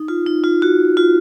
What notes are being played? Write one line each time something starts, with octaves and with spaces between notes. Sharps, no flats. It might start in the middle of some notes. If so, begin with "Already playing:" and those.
Already playing: D#4
F4
D#4
F4
F#4
F4